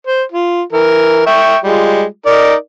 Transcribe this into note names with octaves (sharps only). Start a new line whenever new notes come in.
C5
F4
E3 A#4
E5 G5 C#6
G3 G#3 F4
D#4 A#4 D5